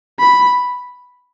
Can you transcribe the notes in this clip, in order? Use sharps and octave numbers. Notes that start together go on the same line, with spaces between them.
B5